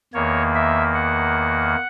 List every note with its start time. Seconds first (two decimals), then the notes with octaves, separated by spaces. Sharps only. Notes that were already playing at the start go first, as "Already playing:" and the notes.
0.14 E2 D#3 A#3 C#5
0.55 E5
0.94 F#5